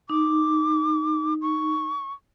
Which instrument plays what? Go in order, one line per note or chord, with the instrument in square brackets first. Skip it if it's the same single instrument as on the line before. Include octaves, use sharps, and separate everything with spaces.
[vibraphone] D#4 [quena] D6
[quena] C#6